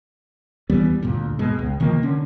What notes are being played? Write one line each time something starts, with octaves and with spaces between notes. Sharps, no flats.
E2 E3 G3 B3
D2 G2 A#2
B2 G#3
C#2
C3 D#3 F3 A#3
D3 C#4